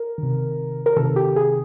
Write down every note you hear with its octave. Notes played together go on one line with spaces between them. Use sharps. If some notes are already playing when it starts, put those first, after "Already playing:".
Already playing: A#4
C3 D#3
A#4
C3 D#3 A4
G4
G#4